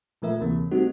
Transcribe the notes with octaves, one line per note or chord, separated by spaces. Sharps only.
A#2 F3 A3 A#4 E5
D2 C3 E3 A#3
G3 A3 C4 D#4 F#4